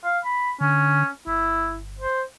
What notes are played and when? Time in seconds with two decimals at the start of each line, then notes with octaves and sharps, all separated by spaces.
0.04 F5
0.25 B5
0.61 D3 C#4
1.27 G1 E4
2.00 C5